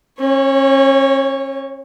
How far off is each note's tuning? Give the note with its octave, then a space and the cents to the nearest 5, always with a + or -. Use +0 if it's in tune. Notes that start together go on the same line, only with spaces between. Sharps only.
C#4 -40 C#5 +0